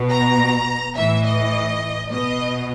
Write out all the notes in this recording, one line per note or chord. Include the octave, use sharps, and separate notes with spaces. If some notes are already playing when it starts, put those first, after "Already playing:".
Already playing: B2
A#5
A2 E3 E5
D#5
B2 D#5